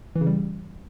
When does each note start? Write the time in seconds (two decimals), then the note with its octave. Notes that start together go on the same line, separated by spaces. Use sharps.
0.16 E3
0.21 C#3
0.26 G3